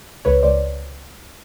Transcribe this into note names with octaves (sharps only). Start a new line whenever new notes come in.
C#2 B4 C#5
C#2 C5 D5